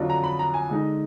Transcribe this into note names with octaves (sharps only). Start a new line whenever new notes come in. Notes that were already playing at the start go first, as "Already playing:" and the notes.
Already playing: F2 D3 F#3 D4 F4
A#5
B5
A#5
G#5
D3 G#3 D#4